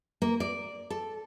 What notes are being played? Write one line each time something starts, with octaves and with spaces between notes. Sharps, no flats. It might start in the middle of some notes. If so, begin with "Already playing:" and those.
A#3
D5
A4